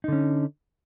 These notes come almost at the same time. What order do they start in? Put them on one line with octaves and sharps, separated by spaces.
D#4 D3 C#4